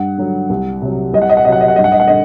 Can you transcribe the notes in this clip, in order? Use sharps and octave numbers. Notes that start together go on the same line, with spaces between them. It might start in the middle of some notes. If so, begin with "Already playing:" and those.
Already playing: G2 F#5
D3 F#3
C2
C3 F#3
C2 D#5
F#5
D#5
F#5
C3 F#3 D#5
F#5
D#5
F#5
G2 D#5
F#5
D#5
F#5
D3 D#5